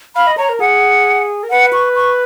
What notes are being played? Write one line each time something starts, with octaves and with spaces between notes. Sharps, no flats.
F5 B5
D#5
C#5 A#5
A#4
G#4 F#5
A#4
B4 F#5
C#6
C#6